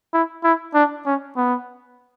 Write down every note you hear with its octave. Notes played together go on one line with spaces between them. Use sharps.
E4
E4
D4
C#4
B3